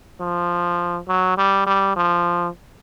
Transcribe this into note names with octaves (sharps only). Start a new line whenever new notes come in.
F3
F#3
G3
G3
F3